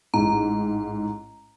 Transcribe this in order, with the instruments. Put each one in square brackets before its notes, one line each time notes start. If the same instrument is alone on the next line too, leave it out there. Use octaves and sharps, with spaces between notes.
[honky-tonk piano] A1 G#2 [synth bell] A#5